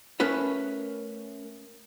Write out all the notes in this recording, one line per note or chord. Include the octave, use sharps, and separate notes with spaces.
A3 C#4 A#4 B4 C#5